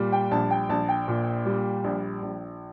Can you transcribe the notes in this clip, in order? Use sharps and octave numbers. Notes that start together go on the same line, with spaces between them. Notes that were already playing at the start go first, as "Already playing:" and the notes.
Already playing: A#2 G3
G5
A#1 A5
G5
A#1 A5
G5
A#2
G3
A#1
A#1